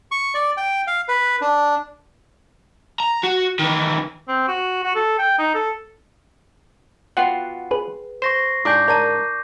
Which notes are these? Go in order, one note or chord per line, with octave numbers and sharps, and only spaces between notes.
C#6
D5
G5
F5
B4
D4
A#5
F#4
D#3 E3
C4
F#4
F#4
A4
G5
D#4
A4
B3 F4 F#4 F#5 G5 F#6 C7
G#4 B4
C5 C#6 A#6 C7
G#2 D4 E4 G#5 D6 G6
A#4 D5 A5 A#5 D#7